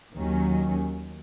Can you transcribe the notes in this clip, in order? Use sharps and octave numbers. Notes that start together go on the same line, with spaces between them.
D#2 D#3 F#3 C#4